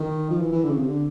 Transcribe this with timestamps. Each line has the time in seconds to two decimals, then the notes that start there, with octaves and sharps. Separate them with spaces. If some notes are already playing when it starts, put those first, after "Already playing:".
Already playing: D#3
0.30 F3
0.41 E3
0.52 E3
0.64 D3
0.70 C#3
0.76 C3
0.88 D3